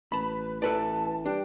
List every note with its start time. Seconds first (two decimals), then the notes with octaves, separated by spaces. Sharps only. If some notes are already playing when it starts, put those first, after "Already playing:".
0.12 A1 B4 A5 B5
0.62 E3 A4 B4 D5 A5
1.26 G3 D4 G5